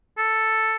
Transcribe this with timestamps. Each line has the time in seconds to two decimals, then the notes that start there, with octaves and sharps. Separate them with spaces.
0.18 A4